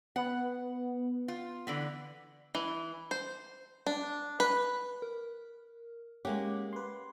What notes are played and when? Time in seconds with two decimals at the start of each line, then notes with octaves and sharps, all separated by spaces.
0.16 B3 F#5
1.28 F4
1.67 D3 E3 B3
2.55 E3
3.11 C5
3.87 D4
4.40 B4
5.02 A#4
6.25 G#3 A#3 C#4 G4 F#5 D6
6.73 B4 C6